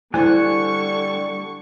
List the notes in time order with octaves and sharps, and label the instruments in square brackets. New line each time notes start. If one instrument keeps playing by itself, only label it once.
[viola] D3 C#6 [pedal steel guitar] G3 G#5 F#6 [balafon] E4 C5